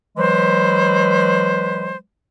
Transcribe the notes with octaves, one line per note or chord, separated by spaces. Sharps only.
E3 F#3 G#3 B4 C5